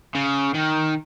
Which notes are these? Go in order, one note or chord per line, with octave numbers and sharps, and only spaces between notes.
C#3
D#3